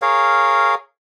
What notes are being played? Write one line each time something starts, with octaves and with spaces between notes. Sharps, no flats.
G#4 A#4 C#5 F5